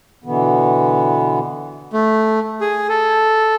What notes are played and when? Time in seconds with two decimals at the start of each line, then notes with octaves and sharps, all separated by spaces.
0.24 B2 D3 E3 B3
1.93 A3
2.61 G#4
2.89 A4